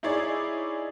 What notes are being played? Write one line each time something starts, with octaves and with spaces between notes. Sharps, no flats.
D#4 E4 G#4 C#5 D5